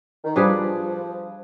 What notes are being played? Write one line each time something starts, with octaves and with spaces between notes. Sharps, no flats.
D#3
F3 G3 D4 G#4 B4